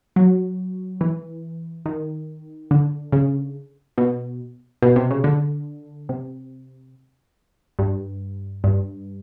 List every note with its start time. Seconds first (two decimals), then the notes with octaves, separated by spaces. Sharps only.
0.16 F#3
1.01 E3
1.86 D#3
2.71 D3
3.12 C#3
3.98 B2
4.82 B2
4.96 C3
5.11 C#3
5.24 D3
6.09 C3
7.79 G2
8.64 G2